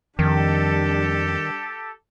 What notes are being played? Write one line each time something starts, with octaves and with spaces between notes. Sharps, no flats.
F2 D#3 G3 D4 G4 A4